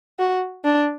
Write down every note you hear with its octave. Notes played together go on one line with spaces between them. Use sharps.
F#4
D4